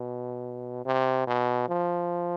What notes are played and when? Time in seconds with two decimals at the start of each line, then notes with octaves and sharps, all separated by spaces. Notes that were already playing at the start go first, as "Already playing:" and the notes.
Already playing: B2
0.85 C3
1.27 B2
1.69 F3